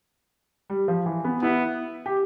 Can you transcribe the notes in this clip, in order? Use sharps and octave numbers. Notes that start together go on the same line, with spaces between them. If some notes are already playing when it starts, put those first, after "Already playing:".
G3
F3
E3
B3
B3 E4
G4